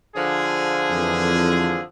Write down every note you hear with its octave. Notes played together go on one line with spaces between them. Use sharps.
D3 F3 G#4
F2 E3